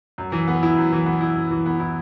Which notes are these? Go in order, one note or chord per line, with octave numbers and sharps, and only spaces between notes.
F#2
E3
B3
E4
F#2
E3
B3
E4
F#2
E3
B3
E4